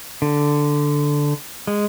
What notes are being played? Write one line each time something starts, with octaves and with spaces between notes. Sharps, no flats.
D3
G#3